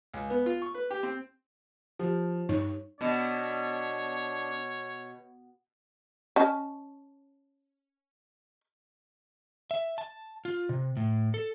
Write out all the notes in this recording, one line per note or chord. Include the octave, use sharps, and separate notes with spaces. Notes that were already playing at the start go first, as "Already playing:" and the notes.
C#2
B3
F4
C#6
B4
G4
C4
F3 G4
G2 D#4 C#5
B2 D4 C#5
C#4 D#5 A5
E5
A5
F4
C3
A2
A4